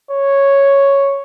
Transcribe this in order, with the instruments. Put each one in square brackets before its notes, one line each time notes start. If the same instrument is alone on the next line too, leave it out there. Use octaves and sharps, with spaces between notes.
[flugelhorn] C#5